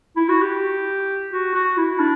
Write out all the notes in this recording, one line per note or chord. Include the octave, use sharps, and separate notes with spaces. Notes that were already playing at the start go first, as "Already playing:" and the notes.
E4
F#4
G4
F#4
F#4
E4
D4